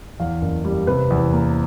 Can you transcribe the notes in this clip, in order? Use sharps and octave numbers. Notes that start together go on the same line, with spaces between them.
E2 F5
F#1
G3
C3 B4
E2
A#3